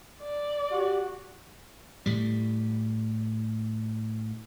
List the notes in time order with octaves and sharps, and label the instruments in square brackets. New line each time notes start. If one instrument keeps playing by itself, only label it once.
[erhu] D5
[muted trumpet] F#4 [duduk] G4
[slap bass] A2 G3